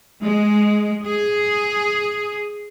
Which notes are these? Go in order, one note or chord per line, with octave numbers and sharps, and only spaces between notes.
G#3
G#4